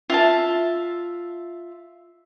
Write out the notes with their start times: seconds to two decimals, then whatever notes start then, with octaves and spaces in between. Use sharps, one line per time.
0.10 F4 E5 A5